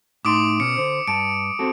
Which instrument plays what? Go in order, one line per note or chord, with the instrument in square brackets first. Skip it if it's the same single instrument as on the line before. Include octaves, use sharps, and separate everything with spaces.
[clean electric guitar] A2 D#4 C6 [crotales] D6 D#6 D7
[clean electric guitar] B2 C#4 [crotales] C#7
[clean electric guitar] D3 C5
[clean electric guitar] G2 A5 [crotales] D7
[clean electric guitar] C4 F#4 A4